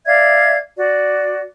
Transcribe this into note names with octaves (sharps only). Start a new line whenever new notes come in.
D5 E5 F5 G#6
F#4 D5